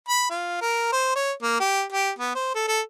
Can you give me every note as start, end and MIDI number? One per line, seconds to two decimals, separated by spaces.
0.09 0.26 83
0.30 0.61 65
0.61 0.90 70
0.92 1.11 72
1.16 1.32 73
1.42 1.58 58
1.60 1.83 67
1.93 2.11 67
2.19 2.34 59
2.35 2.51 72
2.55 2.64 69
2.68 2.81 69